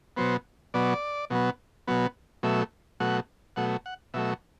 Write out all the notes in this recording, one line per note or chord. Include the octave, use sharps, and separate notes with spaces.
B2 F#3 B3 C5
B2 F#3 B3 D5
B2 F#3 B3
B2 F#3 B3
B2 F#3 A3 E5
B2 F#3 A3 F#5
B2 F#3 A3 F#5
F#5
B2 F#3 A3 E5